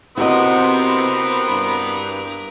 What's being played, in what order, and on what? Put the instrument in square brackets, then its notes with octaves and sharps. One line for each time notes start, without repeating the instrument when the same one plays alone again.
[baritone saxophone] C3 [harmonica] B3 C4 [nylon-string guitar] E4 F#4 D#5 [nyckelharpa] A#4 B4
[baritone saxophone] G2